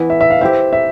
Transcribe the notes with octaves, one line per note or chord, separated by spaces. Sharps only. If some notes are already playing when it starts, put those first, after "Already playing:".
Already playing: E3 B3 E4
E5
E5
F5
C4 E4 G4 E5
E5